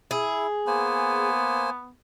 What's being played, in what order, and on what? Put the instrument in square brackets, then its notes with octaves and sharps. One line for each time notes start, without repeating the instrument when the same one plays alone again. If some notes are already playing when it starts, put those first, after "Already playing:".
[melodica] E4 [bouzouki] G#4
[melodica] A#3 C5 G#5 [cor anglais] B3